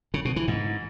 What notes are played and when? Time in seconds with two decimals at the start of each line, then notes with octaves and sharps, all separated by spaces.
0.14 C#3
0.25 B2
0.36 E3
0.48 G#2